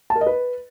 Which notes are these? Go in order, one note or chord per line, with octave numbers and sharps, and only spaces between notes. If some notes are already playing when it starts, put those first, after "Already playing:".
A5
A#4
D#5
B4